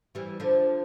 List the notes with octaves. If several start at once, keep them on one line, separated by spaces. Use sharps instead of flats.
E3 G3
D3 F3